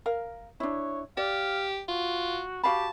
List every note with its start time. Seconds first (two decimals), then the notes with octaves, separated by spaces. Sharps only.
0.06 A#4 F5
0.60 D4 E4 C#5
1.17 G4 D5 F5
1.89 F4 F#4
2.64 F#4 G4 F5 A5 B5